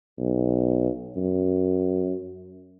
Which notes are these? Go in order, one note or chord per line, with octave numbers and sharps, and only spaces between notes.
B1
F#2